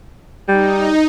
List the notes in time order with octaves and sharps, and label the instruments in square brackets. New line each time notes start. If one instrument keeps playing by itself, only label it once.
[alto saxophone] G3 [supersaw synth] D#4